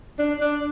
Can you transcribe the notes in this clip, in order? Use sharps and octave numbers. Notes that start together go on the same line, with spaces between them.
D4
D4